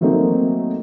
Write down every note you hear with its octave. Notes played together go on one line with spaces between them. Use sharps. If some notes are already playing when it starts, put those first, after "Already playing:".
F#3 A3 A#3 C4 D#4